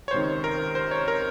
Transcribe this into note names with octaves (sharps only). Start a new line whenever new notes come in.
C#5
C#2 C3 D#3 C5
A#4
C5
C#5
A#4